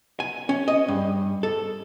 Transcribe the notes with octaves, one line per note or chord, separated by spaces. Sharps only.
G#5
C#4
D#5
G2
A4